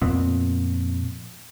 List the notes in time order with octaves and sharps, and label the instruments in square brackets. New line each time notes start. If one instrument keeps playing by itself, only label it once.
[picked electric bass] F2 A#2 B3 C4